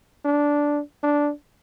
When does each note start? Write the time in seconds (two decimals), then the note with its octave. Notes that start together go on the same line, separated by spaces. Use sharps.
0.25 D4
1.03 D4